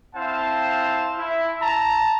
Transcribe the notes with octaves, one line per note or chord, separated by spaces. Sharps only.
C4 E4 C5 F5 A5
E4
A5 A#5